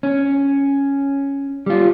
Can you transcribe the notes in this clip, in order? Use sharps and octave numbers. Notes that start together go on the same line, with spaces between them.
C#4
G3 F4